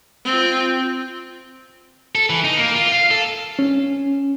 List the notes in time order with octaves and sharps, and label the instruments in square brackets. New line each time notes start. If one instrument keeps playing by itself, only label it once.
[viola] C4 F4
[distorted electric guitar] A4
E3
D#4
A#3
F4
F5
A4
[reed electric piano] C#4